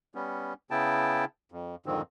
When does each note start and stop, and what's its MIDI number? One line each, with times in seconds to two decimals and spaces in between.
0.15 0.54 55
0.15 0.54 59
0.15 0.54 61
0.71 1.25 49
0.71 1.25 59
0.71 1.25 64
0.71 1.25 79
0.71 1.25 81
1.52 1.75 41
1.86 2.02 41
1.86 2.02 44
1.86 2.02 50
1.86 2.02 51
1.86 2.02 53
1.86 2.02 60